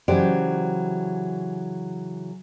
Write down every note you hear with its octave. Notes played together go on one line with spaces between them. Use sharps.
C#3 E3 F#3 G4 C5 D5